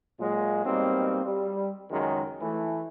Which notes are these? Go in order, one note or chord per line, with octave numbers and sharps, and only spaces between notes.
A#2 F#3 G#3
B2 F#3 G3 A#3 C4 D#4
G3
C#2 F#2 D#3 F#3 G#3
E3 A3